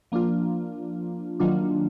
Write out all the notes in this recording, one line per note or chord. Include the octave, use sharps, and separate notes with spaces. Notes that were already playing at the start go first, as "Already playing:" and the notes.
F3 A#3 D4 F4
D#3 F#3 A#3 D4 F4